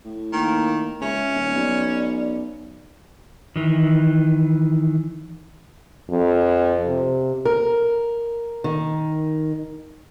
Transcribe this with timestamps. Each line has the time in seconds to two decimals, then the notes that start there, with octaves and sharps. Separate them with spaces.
0.05 A2
0.33 D#3 A#3
1.02 C#2 C#4 E5
1.34 D#1
1.54 B1 D5
3.56 D#3 E3
6.10 F2
6.88 C3
7.45 A#4
8.64 D#3